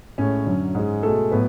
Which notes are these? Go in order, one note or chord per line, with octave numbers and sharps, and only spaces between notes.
A2 G#3 C#4
F#2 D3 F#3
G#2 G#3
B2 G#3 A3 A4
A2 F#3 B3 B4